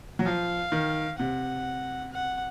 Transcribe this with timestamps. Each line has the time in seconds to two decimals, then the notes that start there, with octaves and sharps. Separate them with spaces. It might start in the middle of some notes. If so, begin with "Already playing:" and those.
0.19 F#3
0.25 F3 F5
0.72 D#3
1.18 C3 F#5
2.12 F#5